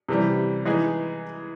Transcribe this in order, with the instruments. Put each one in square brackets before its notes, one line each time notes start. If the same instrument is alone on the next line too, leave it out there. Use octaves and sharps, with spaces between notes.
[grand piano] C3 E3 G3
E3 G#3 B3 D#4 G#4